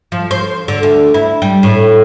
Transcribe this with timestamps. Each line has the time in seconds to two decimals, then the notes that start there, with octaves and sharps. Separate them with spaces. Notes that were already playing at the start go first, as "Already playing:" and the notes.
0.12 F3
0.31 C5
0.68 D3
0.83 D2
1.14 E4
1.42 G3
1.63 A2